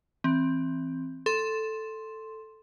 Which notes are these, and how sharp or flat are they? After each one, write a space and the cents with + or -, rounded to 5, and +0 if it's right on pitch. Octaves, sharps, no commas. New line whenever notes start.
E3 +0 C4 +10
A4 +0 C6 +5